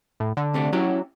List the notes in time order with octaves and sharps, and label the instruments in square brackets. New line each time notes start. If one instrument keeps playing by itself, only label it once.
[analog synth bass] A2
D3
[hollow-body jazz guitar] C3 A3 D4
[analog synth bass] F#3 [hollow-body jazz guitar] C#4 E4 G4